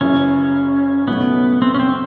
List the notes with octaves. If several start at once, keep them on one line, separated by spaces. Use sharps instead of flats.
F#1 F#2 C#3 E3 C#4
B1 B2 F#3 A3 B3 C#4
C4
C#4
C4